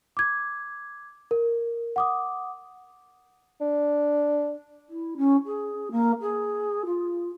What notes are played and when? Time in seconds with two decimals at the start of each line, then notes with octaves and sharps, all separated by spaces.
0.17 D6 G#6
1.31 A#4
1.96 F#5 D6 D#6
3.61 D4
4.87 E4
5.16 C#4
5.46 G#4
5.91 A#3
6.21 G#4
6.85 F4